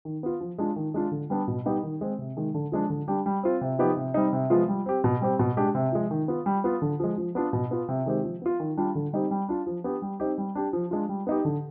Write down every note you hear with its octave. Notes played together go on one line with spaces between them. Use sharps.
D#3
B3 F4
F3
G#3 D4 F4
D#3
G#3 D4 F4
D3
G3 B3 D4
B2
G3 B3 D#4 G4
D#3
G#3 C4
C3
D#3 G#3
D3
F3 G#3 D4
D3
G3 D4 G4
G3
C4 F4
C3
F3 B3 D#4 G4
C3
G3 C4 D#4
C3
F3 G#3 B3 F4
G3
C4 G4
B2
G3 C4 G4
B2
G#3 D4 G4
C3
F3 G#3
D#3
B3 F4
G3
B3 F4
D3
F3 G#3
F3
B3 D4 F4
B2
B3 F4
C3
D#3 G#3 C4 G4
F3
B3 F4
D#3
G3 D4 F4
D3
G3 C4 D#4 G4
G3
D4 F4
F3
B3 D4 G4
G3
C4 D#4 G4
G3
D4 G4
F3
G#3 D4 F4
G3
B3 D#4 G4
D3